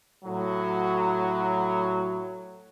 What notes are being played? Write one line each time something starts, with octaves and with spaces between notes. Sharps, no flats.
A2 F#3